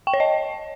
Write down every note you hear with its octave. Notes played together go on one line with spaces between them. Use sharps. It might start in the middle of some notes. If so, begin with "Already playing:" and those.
G5
C#5
D#5